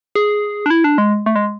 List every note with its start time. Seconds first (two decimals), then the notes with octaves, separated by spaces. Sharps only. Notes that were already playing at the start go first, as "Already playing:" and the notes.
0.15 G#4
0.66 D4
0.70 E4
0.84 D4
0.98 G#3
1.26 A3
1.36 G#3